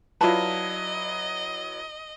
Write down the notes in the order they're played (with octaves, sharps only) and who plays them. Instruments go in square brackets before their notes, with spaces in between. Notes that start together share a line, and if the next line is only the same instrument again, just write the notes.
[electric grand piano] F#3 E4 B4 [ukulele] F4 D5 A5 [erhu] D#5